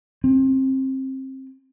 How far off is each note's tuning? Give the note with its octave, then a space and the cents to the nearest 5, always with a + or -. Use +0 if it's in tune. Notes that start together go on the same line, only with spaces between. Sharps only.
C4 +25